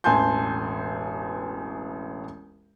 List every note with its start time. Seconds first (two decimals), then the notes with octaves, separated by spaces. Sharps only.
0.04 E1 A1 G#5 A5 C6 G6